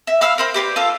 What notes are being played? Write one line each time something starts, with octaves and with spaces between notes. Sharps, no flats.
E5
F5 B5 E6 F6
A#4 C5 B5
G4 B4 D5
F4 A4 F5